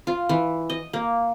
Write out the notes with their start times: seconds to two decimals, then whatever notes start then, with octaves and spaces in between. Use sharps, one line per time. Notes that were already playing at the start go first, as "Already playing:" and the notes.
0.07 F4
0.29 E3
0.70 D#5
0.93 A#3